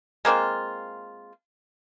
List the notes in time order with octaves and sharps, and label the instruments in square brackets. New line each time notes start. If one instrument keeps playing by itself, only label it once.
[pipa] G#3 A#3 C4 F4